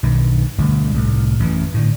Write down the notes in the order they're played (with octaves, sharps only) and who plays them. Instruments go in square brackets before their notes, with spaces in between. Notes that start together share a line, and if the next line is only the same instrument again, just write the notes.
[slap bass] B1 G2 D#3
G1 D2 B2 D3
C2 A2
A1 F#2 B2 E3
A2 D3